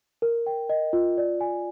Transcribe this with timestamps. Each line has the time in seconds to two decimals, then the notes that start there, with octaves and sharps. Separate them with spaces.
0.22 A#4
0.46 G5
0.70 D#5
0.93 F4
1.18 D5
1.41 G#5